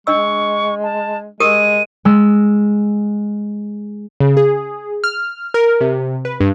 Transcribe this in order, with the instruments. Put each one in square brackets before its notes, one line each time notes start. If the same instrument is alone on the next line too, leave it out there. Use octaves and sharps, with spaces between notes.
[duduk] G#3 [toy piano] D4 D#5 E6 [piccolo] C#6
[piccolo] A5
[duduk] G#3 [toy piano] G4 A#4 D#6 [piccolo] D#7
[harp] G#3 E6
[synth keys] C#3
G#4
F6
A#4
C3
B4
G2